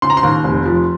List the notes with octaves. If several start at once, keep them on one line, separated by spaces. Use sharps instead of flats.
C#3 C6
A#5
C6
D#2
F1
F3